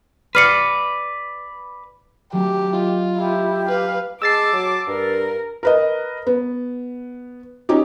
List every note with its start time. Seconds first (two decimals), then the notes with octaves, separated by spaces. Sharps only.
0.35 B4 D5 F6 C7 C#7
2.33 F#3 A3 C#4 G4
2.73 F4 D#5
3.18 E4 G4 A#5 G#6
3.68 B4 F5
4.22 G#3 A5 D6 E6 A6 C7
4.53 F#3
4.87 G2 A#4
5.63 A#4 B4 D#5
6.27 B3
7.69 C#4 D#4 G4